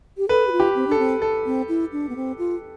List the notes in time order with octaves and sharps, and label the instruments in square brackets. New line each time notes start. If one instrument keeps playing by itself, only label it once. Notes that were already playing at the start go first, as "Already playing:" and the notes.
[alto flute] G4
[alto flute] A4 [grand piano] B4
[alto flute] G4
F4
[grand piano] G4
[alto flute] C4
[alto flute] D4 [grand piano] A4
[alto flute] C4
[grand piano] A4
[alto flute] C4
E4
D4
B3
C4
F4